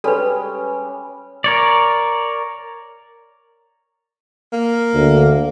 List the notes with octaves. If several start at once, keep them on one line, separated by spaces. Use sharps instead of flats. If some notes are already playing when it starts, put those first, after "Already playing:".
G3 G#3 C#4 A4 B4
A#4 C#5 D5
A#3
D2